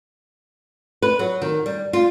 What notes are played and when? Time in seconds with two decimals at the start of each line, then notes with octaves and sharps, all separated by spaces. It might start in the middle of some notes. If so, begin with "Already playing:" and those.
1.02 B4
1.19 F#3
1.42 D#3
1.66 G3
1.93 F4